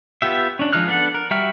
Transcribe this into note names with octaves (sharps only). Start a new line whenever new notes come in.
B3 F4 G4 E5
C#4 D4
F3 G#3 D#4 F6 F#6
B3 D4 A4 F#5
A#4
G3 F#4 E5 G5 F6